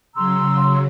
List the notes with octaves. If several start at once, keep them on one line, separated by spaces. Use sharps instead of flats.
C#3 F#3 A#5 C6 E6